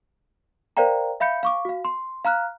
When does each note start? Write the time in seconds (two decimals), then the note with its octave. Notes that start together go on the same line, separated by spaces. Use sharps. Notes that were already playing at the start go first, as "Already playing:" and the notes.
0.77 A#4 C5 D5 F5 G5 A#5
1.20 E5 F5 B5 G6 C#7
1.43 F5 C#6 D6
1.65 F#4 F5
1.85 C6
2.25 F5 A#5 F6 F#6